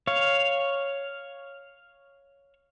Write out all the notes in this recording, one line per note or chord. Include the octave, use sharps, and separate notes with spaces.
C#5 F5